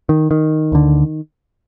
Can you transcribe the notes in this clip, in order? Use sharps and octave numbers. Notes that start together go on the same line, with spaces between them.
D#3
D#3
D2 D3